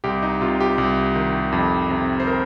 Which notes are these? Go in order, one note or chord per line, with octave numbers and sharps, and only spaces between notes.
C2 G4
D#4
C3 F4
G4
C2
D#3
F2
C3
C5
A#4